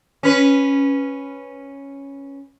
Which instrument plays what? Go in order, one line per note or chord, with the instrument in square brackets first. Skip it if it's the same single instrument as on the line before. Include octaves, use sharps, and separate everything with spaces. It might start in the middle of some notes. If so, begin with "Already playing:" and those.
[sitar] C#4 B4